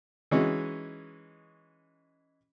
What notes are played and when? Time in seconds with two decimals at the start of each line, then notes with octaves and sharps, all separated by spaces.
0.31 E3 G#3 C#4 D#4 F#4